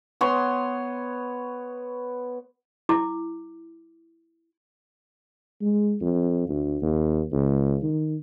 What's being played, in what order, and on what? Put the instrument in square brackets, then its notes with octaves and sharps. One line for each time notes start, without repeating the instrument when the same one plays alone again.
[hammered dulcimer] B3 C#5 C6
[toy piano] E4 D6
[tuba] G#3
F2
D2
D#2
C#2
D#3